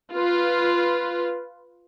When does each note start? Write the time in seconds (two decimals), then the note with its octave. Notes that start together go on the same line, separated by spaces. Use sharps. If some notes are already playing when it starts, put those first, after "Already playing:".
0.11 F4 B4